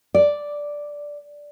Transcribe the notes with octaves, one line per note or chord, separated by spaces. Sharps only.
D5